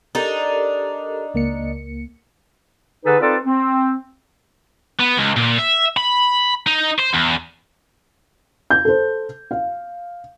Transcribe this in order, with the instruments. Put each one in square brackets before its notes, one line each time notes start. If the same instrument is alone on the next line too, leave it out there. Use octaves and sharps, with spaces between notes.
[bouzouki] D4 D#4 [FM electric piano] G4 A4 A#4
[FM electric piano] C#2 A#3 C#7
[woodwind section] D3 D#4 G#4 A4 B4
C4 D#4 F4 A4 B4 D5
C4
[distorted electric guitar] B3
C#2
A#2
E5
B5
D#4
C5
E2
[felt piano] G6
A4 C5
F5